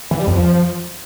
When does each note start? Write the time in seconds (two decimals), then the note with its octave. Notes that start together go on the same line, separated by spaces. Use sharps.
0.11 E3
0.19 G3
0.27 F2
0.35 F3